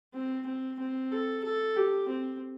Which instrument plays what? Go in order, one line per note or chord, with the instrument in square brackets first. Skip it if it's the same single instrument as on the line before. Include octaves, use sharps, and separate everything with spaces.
[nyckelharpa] C4
C4
C4
A4
A4
G4
C4